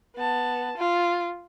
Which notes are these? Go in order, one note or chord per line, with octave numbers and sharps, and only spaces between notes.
B3 A5
F4